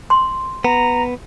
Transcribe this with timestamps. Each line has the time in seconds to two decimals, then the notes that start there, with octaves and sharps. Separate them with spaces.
0.10 C6
0.65 B3 A#5